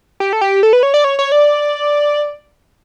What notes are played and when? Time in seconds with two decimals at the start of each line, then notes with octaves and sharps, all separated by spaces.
0.20 G4
0.33 A4
0.41 G4
0.63 A4
0.73 B4
0.83 C#5
0.94 D5
1.04 C#5
1.19 C#5
1.32 D5